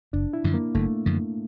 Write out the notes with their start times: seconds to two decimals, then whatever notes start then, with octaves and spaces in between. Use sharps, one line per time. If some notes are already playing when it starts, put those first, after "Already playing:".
0.13 F#1 D4
0.33 E4
0.44 F#2 D3 F3
0.54 A#3
0.75 F#1 A3
1.06 F#2 D3 F3